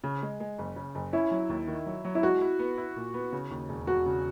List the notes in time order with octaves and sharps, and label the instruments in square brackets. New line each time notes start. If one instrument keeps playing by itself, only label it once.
[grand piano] C#3
G#3
G#3
F#1
C#3
F#1
[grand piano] C#4 [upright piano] E4
[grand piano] F#3
D#2
D#3
F#3
F#3
[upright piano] E4
[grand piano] G#3 [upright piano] F#4
[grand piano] E4
B3
E4
A#2
B3
C#3
D#2
E1
[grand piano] E1 [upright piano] F#4
[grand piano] C#3